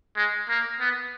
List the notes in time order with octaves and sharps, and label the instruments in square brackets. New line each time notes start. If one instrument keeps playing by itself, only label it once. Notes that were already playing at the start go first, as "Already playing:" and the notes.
[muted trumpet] G#3
A#3
B3